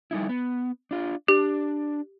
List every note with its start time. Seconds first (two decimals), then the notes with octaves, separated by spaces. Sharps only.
0.11 G3 D#4 E4
0.29 B3
0.91 D4 F4
1.28 D4 G4